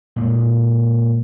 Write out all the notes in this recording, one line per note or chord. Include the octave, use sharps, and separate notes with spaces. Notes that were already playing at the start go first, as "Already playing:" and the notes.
A#2 G#3